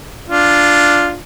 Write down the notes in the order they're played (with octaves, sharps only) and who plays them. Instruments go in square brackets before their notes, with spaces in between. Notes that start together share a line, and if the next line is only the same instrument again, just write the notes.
[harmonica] D4 F4